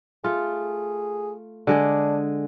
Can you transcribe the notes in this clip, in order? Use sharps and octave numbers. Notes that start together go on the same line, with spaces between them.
A3 F4 G#4
D3 G#3 D4 G#4